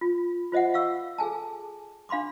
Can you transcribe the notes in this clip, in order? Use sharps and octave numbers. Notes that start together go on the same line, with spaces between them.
F4
F4 C5 D#5 E5 F#5
F5 C#6 E6
G#4 A4 G#5 A5
D4 F5 B5 C6 D6